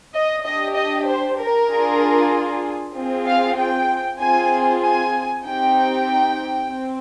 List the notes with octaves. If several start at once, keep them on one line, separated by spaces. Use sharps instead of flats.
D#5
D4 G4 D#5
D#5
C5
A#4
D4 F4 G#4
C4 F4 G#4
F5
G5
C4 F4 G#4 G#5
G#5
C4 D#4 G4 G5
C4